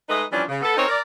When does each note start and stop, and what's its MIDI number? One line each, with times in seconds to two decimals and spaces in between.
0.09 0.23 56
0.09 0.23 57
0.09 0.23 63
0.09 0.23 71
0.09 0.23 75
0.32 0.42 52
0.32 0.42 53
0.32 0.42 55
0.32 0.42 61
0.32 0.42 62
0.49 0.60 49
0.62 0.73 59
0.62 0.73 69
0.76 0.87 60
0.76 0.87 63
0.76 0.87 70
0.76 0.87 72
0.76 0.87 73
0.88 1.00 70
0.88 1.00 74